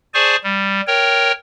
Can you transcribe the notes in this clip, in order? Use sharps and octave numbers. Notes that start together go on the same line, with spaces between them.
G#4 C5 D5 G#5 A5 C#6
G3
A#4 C#5 G5